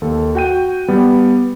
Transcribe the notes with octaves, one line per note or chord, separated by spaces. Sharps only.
D#2 A4
F#4 G5 D#7
G3 B3